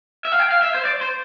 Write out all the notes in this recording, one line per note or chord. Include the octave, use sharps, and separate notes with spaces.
E5
F5
G5
F5
E5
C5
D5
C5